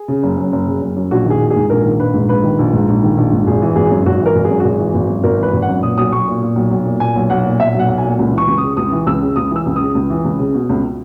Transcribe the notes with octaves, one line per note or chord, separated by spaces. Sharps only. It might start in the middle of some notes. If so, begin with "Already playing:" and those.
Already playing: G#4
C#3
F#1
F#2
F#1
C#3
F#1
F#2
A#1 F#4
D#3 G#4
A#1
G#4
G#2
A#1 A#4
D#3
A#1 B4
G#2
A#1 B4
D#3
A#1
G#2
A#1
D#3
A#1
G#2
G#1 G#4
E3
G#1 G#4
F#2
G#1 F#4
E3 A#4
G#1
G#4
F#2
F#4
G#1 G#4
E3
G#1
F#2
G#1 A#4
E3 B4
G#1
F#5
F#2
A#2 D#6
B1 D#6
B1 C#6
A#2
A#2
B1
B1
A#2
A#2 G#5
B1
B1 F#5
A#2
A#2 E5
B1 F#5
B1
G#5
A#2
C#2
E3 C#6
C#2
D#6
C#3
C#2 D#6
E3
C#2 E6
C#3
C#2 D#6
E3 E6
C#2
C#3 D#6
C#2
E3
C#2
C#3
B2
C#2